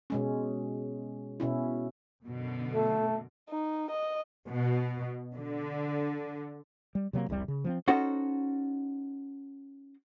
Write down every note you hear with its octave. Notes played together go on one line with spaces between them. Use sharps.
B2 G#3 C#4
B2 C#4 E4
F#2 B2 D3
A3 A4
D#4
D#5
B2
D3
G3
C3 F#3 G3 A#3
F1 C2 C3 G3
C#3
F3 B3 C4
C#4 D#4 F#4 A4 C5